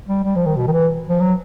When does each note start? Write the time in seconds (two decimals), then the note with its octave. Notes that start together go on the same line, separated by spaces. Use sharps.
0.09 G3
0.24 G3
0.36 F3
0.46 D#3
0.56 B2
0.67 D#3
0.72 E3
1.09 F3
1.20 F#3